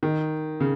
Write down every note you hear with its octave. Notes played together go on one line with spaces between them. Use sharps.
D#3
C#3